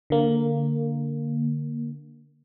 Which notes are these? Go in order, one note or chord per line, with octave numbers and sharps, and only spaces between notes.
D3 A#3